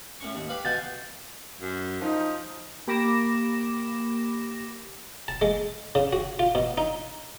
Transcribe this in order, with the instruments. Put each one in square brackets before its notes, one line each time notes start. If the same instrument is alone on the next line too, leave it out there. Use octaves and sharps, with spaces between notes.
[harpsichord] A2 C#4 C#6
D#2
G4 B4 F5
[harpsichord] B2 F5 G#5 [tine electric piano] G6 A6
[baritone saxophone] F#2
[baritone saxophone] F3 [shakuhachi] D#4
[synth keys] A#3 G4 B5 D6 A#6 E7
[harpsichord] A5
G#3
C#3
F#4
F4
B2
D#4